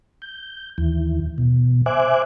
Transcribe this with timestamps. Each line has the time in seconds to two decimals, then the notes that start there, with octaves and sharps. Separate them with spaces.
0.22 G6
0.78 D#2 E3
1.38 B2
1.86 C5 E5 G#5 D6 F#6